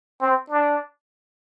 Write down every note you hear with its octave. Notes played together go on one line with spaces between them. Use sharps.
C4
D4